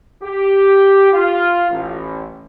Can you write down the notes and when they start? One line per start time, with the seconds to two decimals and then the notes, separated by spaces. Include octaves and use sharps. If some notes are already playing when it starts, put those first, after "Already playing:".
0.23 G4
1.13 F4
1.70 A1